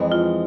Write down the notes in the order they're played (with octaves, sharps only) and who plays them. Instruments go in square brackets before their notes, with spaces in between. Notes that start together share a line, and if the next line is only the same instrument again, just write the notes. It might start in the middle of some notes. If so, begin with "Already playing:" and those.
Already playing: [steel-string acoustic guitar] F2 E3 G#3
[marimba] F4